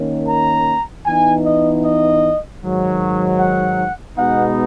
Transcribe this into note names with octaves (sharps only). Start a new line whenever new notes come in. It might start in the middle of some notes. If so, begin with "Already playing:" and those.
Already playing: D#3 A#3 C#4
A#5
E3 B3 D#4 G#5
D#5
D#5
G#2 D#3 F#3
F#5
B2 G#3 B3 D#4 F#5